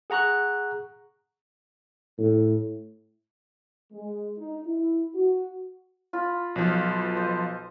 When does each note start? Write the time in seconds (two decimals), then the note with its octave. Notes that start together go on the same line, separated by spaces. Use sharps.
0.10 G#4 F#5 A#5 C#6 F#6
2.18 A2
3.92 G#3
4.38 D#4
4.67 E4
5.15 F#4
6.13 F4 B5
6.56 B1 F3
6.75 B5
7.02 B4
7.17 C5 D#5